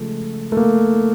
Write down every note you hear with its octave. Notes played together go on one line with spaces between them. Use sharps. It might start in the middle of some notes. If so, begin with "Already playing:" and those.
Already playing: C#3 F3 G#3 A3
A3
A#3